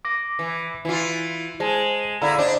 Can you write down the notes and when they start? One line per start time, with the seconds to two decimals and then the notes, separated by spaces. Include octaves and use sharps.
0.05 D6 A#6
0.39 E3
0.85 E3 E4 F4
1.60 G#3 C5 A5
2.22 D3 E4 F5 A#5
2.39 D4 C5 D#5